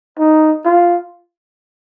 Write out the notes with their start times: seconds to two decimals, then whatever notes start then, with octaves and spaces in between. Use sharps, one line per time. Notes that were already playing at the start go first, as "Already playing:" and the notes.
0.19 D#4
0.65 F4